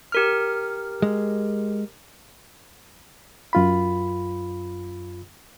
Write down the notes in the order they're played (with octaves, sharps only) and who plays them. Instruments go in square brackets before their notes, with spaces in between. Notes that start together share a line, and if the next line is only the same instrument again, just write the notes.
[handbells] G4 A#4 F6
[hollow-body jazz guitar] G#3
[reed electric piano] F#2 F4 B5